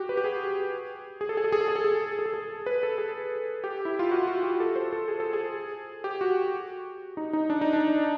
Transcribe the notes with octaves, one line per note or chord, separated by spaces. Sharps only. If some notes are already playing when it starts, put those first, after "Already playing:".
Already playing: F#4 G4
B4
G4
G#4
G#4
A4
G#4
A4
G#4
A4
G#4
A4
G#4
A4
G#4
A4
B4
A4
G#4
G4
E4
F4
F#4
F#4
G4
A4
C5
A4
G#4
A4
G#4
G4
F#4
D#4
D#4
D4
D#4
D4